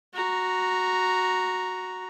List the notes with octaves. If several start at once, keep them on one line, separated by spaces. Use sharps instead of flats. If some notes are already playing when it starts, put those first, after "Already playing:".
F#4 A#5